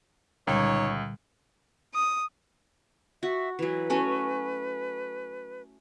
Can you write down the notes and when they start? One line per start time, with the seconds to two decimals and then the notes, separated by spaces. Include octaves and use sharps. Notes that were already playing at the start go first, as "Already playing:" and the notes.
0.47 C#2 A#2 D3 G3 D#4 C#5
1.95 D#6
3.23 F#4 E5
3.59 E3 F#3 B4
3.90 A3 C#4 F#4